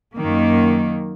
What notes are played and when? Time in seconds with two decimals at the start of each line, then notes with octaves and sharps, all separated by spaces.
0.17 F#2 D#3 A#3